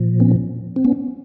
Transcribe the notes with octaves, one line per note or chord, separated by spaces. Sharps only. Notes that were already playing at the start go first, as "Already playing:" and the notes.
Already playing: A#2 F3
B3 C#4
C4
B3 C#4